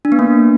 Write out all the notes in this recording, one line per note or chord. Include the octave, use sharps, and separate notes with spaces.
D4
B3
A#3